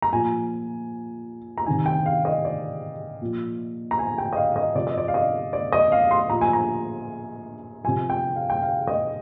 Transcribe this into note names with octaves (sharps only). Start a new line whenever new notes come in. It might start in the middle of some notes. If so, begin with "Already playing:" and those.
A#5
A#2 F3 G#5
A#5
C3 D#3 G#5
G5
F5
D#5
D5
A#2 F3
A#5
G#5
G5
D#5
F5
D#5
C3 F3 D5
D#5
D5
F5
D#5
D5
D#5
F5
C6
A#2 F3 A#5
G#5
A#5
C3 F3 G#5
G5
F5
G5
F5
D#5